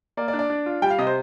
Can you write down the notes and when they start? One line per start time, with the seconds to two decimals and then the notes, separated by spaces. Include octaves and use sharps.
0.17 A#3 D5
0.28 D5
0.33 D4
0.39 D5
0.50 D4
0.66 F4
0.82 G3 G5
0.90 F5
0.98 C3 D#5
1.07 C5